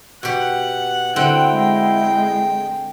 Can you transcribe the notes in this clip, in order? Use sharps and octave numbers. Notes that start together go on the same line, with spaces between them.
B2 G4 F#5
D3 C4 E4 F#5 G5
G#3